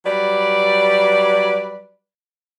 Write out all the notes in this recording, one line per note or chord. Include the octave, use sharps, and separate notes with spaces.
F#3 G3 B4 D5